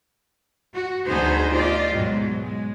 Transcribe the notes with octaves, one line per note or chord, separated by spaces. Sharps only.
F#4
D2 B3 D#4 G#4 C5
F4 G4 D5 D#5
G#2 B2 F#3 G#3
G#3